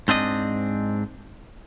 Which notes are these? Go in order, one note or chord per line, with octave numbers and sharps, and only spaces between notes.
G#2 C4 D4 D#5